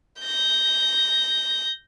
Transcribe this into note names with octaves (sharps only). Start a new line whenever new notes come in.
G6 A#6